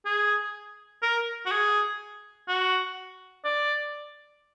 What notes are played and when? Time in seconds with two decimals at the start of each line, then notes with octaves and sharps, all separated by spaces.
0.05 G#4
1.03 A#4
1.46 F#4
1.51 G#4
2.48 F#4
3.45 D5